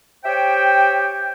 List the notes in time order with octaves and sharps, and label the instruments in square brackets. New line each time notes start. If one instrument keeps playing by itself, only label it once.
[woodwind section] G4 C5 C#5 E5 G5